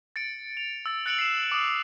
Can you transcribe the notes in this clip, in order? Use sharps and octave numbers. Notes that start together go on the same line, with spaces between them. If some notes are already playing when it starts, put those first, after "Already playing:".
A6 C#7 D7
F7
E6 A6
F#6 A6 C#7 D7 F7 F#7
C7 E7
D6 D#6